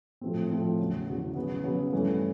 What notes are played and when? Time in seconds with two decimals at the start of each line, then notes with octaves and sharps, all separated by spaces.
0.21 A2 F3 A3 C4
0.51 A2 F3 A3 C4
0.79 E2 C#3 F#3
1.07 E2 C#3 F#3
1.35 C#3 F#3 B3
1.64 C#3 F#3 B3
1.92 G2 E3 A3 C#4